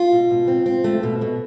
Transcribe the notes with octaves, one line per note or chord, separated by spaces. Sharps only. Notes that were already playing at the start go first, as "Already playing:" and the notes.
Already playing: F4
B2
B2
C4
C4
A3
B2
B2